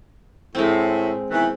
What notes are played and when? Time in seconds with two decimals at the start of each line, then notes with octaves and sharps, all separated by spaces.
0.55 A2 G#3 C4
1.30 B2 D#3 E3